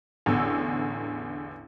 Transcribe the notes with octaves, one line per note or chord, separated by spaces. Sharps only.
A1 E2 D3 E6